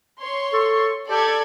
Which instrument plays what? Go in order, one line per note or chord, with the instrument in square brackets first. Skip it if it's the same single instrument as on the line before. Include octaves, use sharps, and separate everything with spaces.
[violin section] C#5 C6
[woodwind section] A4 C#6
[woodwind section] G4 [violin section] A4 D5 G#6